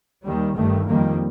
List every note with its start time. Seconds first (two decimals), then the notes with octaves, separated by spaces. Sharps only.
0.23 D#2 D#3 G3
0.56 G1 G2 D#3 A3
0.87 F2 D#3 G3 A#3